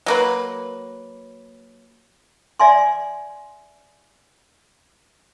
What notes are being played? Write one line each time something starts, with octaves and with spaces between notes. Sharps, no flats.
F#3 A#3 B4
D5 E5 G#5 C6